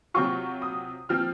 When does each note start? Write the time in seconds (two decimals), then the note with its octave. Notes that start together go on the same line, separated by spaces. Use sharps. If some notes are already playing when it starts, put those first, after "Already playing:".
0.14 C3 F#3 C4 F4 C#6
0.62 D#6
1.09 F3 C4 F6